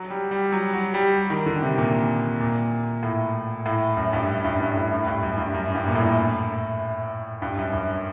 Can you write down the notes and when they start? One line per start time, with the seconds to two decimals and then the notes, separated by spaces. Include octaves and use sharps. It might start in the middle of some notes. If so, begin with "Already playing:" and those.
Already playing: F#3
0.10 G3
0.31 G3
0.52 F#3
0.73 F#3
0.94 G3
1.30 D#3
1.46 D3
1.62 C3
1.78 A#2
2.40 A#2
3.03 A2
3.66 A2
3.97 F#2
4.13 G2
4.44 G2
4.60 G2
4.75 A2
4.91 A2
5.06 G2
5.23 F#2
5.38 G2
5.54 F#2
5.75 G2
5.88 A#2
5.95 A2
7.42 G2
7.57 F#2
7.73 F#2